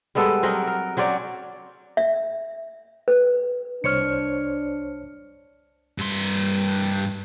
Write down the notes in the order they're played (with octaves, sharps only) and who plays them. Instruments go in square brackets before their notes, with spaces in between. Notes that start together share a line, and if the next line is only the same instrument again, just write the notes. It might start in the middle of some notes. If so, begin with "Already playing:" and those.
[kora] G3 G#3 B3 A4
F#3 C4 A#4 D#5
A#4
F#3 C4 C#4 D5
[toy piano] E5
B4
[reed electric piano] C2 C5 C#5 [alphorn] D4 [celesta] F6 C#7
[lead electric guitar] G2 C6